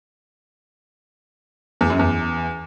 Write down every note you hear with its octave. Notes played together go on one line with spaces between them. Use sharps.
E2
F#2
E2